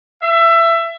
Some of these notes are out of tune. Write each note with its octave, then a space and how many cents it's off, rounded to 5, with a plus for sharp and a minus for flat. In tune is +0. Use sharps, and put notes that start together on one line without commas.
E5 +20